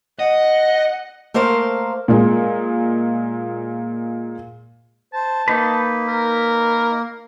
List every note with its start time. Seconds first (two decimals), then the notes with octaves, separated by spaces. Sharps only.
0.19 D#5 F#5
1.34 A3 A#3 A#4 C5 F5
2.08 A#2 G#3
5.14 C5 A5
5.48 A#3 D#4 B4
6.09 A#4